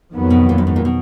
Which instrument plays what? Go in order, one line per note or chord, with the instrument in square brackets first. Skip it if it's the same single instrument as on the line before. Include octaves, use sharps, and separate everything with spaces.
[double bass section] F2 D#3 F#3 B3
[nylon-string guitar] B2
A#2
F#2
G#2
A#2
B2